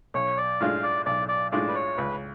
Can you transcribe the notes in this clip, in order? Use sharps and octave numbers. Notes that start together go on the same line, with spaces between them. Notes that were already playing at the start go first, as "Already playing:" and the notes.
B1 C#5
D5
A2 G#3 D4 F4 F5
D5
B1 D5
D5
A2 G#3 D4 F4 D5
B4
C#5
C#2 B4